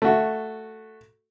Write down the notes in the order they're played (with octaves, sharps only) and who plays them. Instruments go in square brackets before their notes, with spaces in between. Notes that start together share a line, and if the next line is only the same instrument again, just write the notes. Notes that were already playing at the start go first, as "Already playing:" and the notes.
[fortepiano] A3 F#4